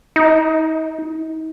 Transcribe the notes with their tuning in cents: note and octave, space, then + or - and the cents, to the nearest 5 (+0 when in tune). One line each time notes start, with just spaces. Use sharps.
D#4 +40